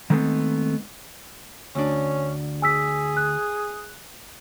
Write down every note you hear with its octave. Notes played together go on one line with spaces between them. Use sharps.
D#3 G#3 A3 B3 C4 D#4
D2 C#4 D4
G#4 G#5 E6 B6
F#6